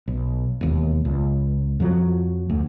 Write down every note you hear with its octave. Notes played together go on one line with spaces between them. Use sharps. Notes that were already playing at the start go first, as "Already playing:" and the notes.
B1
E1 D#2
C#2
F2 F3 F#3
D2